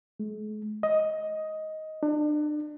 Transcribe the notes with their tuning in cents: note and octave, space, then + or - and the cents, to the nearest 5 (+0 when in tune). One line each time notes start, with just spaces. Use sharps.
G#3 +45
D#5 +10
D4 +35